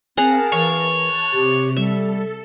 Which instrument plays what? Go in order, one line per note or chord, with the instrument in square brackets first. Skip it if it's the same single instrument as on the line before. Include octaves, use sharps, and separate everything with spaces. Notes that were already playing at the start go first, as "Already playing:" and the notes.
[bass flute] C4 [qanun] G#4 F#5 A#5 [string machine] A#4 F5 A5
[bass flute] E3 [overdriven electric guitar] C#5
[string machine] A5 F#6
[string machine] C3 [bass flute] G4
[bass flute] G3 [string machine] A4 [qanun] E5